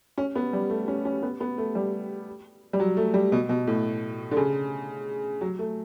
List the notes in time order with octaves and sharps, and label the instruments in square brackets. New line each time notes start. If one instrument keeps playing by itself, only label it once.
[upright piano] C#4
B3
G3
A3
C#4
C#4
B3
B3
A3
G3
G3
F#3
A3
G3
B2
B2
A2
D3
C#3
F#3
A3